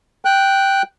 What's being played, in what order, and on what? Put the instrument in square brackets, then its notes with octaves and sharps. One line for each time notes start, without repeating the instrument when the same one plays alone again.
[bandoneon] G5 F#6